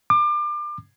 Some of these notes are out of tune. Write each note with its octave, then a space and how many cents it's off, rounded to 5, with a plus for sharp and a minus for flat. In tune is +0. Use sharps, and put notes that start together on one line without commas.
D6 +30